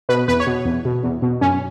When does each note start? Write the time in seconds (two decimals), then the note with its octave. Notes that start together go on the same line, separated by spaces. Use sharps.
0.09 B2 B4
0.28 E2 B4
0.40 C#5
0.47 B2
0.65 E2
0.85 B2
1.03 E2
1.22 B2
1.41 F#2 C#4